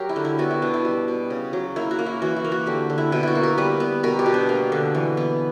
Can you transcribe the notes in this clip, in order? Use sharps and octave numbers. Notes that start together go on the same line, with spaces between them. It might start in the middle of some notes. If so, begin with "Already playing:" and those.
Already playing: F#3 G4 A#4
E4
D3
E4
B3 F#4
E4
B2 D4
E4
G3
B2
C#3
F#3
A#3 E4
F#4
A#3
E4
E3 F#4
E4
A#3
F#4
D3 G4
D3
E4
B2 E4
E4 F#4
A#3
A#4
G3 B4
B3
B2 A#4
G4
B2
D4
A#3
D3
E3
B3